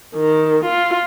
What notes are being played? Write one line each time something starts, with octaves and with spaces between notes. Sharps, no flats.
D#3
F4